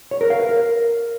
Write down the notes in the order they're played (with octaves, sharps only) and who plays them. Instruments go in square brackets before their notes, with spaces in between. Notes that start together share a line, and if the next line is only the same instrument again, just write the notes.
[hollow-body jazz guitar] C#5
A#4
F5
B4
A#4